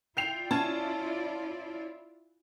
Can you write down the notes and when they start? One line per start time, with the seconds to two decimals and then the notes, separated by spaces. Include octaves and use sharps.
0.17 E4 F4 D5 G5 C7 F7
0.51 C#4 A5 G#6 E7